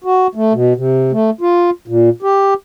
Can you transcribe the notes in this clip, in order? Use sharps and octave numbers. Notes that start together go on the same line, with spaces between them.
F#4
A3
B2
C3
A3
F4
A#2
G4